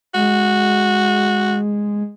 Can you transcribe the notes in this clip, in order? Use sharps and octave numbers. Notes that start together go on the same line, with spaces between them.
G#3 F#4